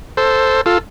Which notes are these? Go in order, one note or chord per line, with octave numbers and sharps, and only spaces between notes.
A4 C5
F4 A4